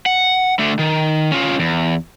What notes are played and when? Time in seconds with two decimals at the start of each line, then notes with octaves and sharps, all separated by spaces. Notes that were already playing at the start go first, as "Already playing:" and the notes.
0.06 F#5
0.59 D3 A3
0.79 D#3
1.32 C#4 F4
1.59 E2